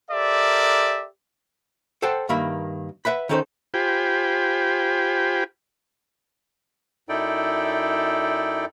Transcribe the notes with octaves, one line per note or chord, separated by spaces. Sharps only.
G4 A4 A#4 C5 D5 E5
A4 C5 F#5 G5 A5
G2 D#3 A#3 E5 B5
B4 E5 F#5 B5
D#3 C#4 D#4 A4 B4 C5
F4 G4 C5 G5 G#5 B5
F#2 D#4 E4 A4 D5 G5